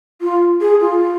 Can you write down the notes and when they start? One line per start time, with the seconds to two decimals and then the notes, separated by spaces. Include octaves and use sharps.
0.22 F4
0.61 G#4
0.81 F4